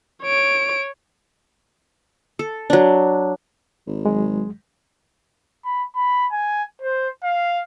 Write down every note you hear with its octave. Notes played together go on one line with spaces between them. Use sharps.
C#5 D7
A4
F#3 D4
G#1
F#3 G#3
B5
B5
G#5
C5
F5